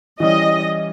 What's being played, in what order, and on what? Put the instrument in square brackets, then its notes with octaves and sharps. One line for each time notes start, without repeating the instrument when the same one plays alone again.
[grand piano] E3 G3 C#4 [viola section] D#5